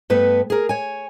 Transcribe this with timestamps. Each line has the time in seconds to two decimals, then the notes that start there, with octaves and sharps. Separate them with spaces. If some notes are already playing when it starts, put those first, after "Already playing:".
0.10 G2 A3 B3 B4
0.50 G#4 A#4
0.69 C#5 G#5